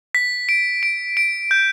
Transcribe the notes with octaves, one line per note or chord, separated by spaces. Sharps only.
B6
D7
D7
D7
G6